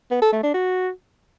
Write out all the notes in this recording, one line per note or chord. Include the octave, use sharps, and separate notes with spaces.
B3
A4
A3
D4
F#4